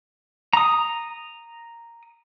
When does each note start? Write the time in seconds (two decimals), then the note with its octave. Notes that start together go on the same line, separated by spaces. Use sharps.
0.53 A#5 D#6